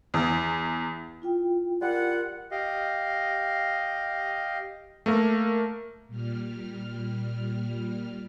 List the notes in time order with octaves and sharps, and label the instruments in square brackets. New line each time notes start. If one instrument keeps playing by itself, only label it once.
[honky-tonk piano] E2
[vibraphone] E4 F4 G5
[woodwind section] G3 F4 F#5 [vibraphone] A#4
[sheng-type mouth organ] G4 D#5 F5
[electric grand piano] A3 A#3 A#4
[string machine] A#2 G3 F6